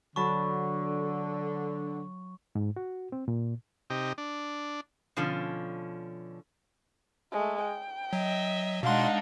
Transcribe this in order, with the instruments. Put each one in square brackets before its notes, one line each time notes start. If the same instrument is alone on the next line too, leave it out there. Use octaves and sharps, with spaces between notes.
[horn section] D3 [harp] F#3 A5 B5 [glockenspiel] C#6
[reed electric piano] G#2
F#4
C4
A#2
[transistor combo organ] C3 D#4 G4
D4
[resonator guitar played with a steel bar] B2 D3 F3 C#4
[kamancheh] G#3 A3
G5
[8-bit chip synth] F#3 [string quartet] D#5 E5
[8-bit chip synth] B2 C6 [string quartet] G#3 D4 D#4 [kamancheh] F5 F#5